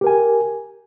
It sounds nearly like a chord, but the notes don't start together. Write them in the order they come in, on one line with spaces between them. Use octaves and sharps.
G4 A#4 G#5